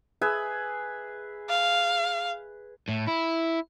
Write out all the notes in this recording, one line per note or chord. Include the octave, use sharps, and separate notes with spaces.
G#4 B4 E5
F5
A2
E4